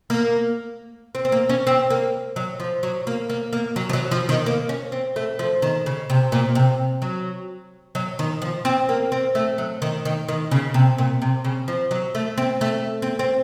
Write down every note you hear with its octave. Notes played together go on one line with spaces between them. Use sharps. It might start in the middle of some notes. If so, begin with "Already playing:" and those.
A#3
C4
C4
A#3
C#4
C4
A#3
F#3
F3
F#3
A#3
A#3
A#3
F#3
F3
F#3
F3
D#3
A#3
C#4
C4
A3
F3
D#3
C#3
C3
A#2
C3
F#3
F#3
D#3
F3
C4
A#3
C4
A3
F#3
D#3
D#3
D#3
C#3
C3
A#2
C3
C#3
F3
F#3
A3
C4
A3
C4
C4